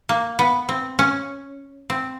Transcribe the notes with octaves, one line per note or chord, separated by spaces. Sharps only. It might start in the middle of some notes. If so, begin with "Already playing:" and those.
A#3
B3
C4
C#4
C4